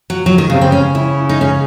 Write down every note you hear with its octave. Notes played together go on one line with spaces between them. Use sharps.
F#3
F#3
D#3
C#3
C3
C#3 C4
C#4
E4
D#4
C#4